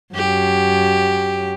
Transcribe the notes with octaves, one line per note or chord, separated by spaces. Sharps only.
F#2 G4